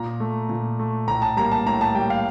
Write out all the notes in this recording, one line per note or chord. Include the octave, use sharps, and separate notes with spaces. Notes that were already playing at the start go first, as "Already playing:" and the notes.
Already playing: A#2 A#5
A3
A#2
A3
A2 A#5
A5
G3 A#3 A#5
A5
A2 A#5
A5
G3 A#3 G5
F5